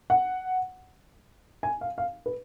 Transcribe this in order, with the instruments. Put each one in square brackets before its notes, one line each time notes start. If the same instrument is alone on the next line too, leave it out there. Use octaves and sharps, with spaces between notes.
[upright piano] F#5
G#5
F5
F5
B4